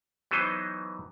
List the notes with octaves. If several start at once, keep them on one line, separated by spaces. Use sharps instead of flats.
E3 F#3 B3 D#4 C5 D#5